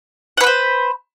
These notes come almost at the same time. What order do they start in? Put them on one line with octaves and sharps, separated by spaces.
F#5 B4 B5 C5